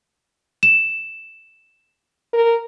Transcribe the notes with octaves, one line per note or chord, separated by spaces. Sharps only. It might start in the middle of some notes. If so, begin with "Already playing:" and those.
E7
A#4